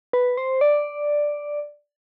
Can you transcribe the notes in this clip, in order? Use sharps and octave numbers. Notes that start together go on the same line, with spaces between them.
B4
C5
D5